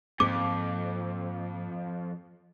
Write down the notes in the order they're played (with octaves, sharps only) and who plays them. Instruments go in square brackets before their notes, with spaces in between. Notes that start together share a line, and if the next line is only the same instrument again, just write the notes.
[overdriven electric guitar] F2 [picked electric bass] G#2 A#3 C4 [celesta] D6